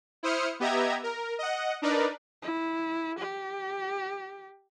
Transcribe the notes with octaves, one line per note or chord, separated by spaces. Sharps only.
E4 C5 D#6 F6 C#7
B3 G4 D#5 E5 A#5 G#6
A#4
D#5 F#5
D4 D#4 A#4 B4 D5
E4
G4